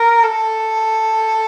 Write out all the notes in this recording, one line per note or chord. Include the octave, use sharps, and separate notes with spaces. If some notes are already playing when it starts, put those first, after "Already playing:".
Already playing: A#4
A4